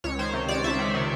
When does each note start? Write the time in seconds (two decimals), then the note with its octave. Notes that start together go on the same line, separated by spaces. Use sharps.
0.04 C#2 C#5
0.19 D#3 C5
0.33 C3
0.48 C#2 D5
0.64 C#2 E5
0.79 D#3
0.94 C3